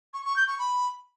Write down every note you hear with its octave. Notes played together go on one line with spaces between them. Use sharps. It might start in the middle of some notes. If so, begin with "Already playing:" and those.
C#6
C#6
G6
C#6
B5